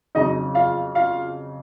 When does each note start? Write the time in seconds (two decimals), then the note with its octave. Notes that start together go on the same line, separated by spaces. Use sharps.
0.15 F2 C#3 F#3 D#4 D#5
0.55 F4 F5
0.95 F4 F5